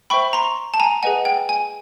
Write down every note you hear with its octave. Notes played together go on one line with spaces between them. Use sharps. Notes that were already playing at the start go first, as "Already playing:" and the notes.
C5 E5 G5 B5 C#6
A#5 C6
A5
G#5 A#5
G#4 B4 D#5 F#5 G#5
G5
G#5